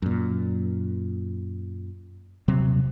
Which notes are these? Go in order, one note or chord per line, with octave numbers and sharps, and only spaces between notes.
F#2 A#2
D#1 C3 F#3 C4